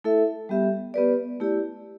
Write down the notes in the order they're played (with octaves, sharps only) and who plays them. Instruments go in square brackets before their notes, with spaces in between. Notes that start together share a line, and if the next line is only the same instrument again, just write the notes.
[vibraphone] A3 E4 A4 E5
G3 B3 G4 E5
B3 G4 B4 D5
A3 E4 G4 D5